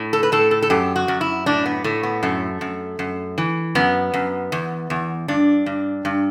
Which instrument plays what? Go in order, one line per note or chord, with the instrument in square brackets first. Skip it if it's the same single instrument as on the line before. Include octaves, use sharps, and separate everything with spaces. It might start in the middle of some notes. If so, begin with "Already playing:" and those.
Already playing: [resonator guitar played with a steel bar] A2
A4
B4
A2 A4
A4
A4
F#2 G4
F#4
F#2
E4
A2 D4
B3
A2 A3
B3
F#2 A3
F#2
F#2
E3
F#2 B3
F#2
E2
E2
G2 D4
G2
G2